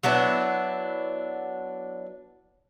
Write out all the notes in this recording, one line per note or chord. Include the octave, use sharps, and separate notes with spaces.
F#3 B3 D4 E4